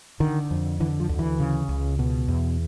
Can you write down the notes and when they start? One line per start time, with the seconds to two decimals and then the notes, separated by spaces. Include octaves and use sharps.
0.20 D3 D#3
0.51 F2
0.80 D3 E3
1.00 F3
1.09 D2
1.19 E3
1.40 C#3
1.69 C#2
1.99 B2
2.28 E2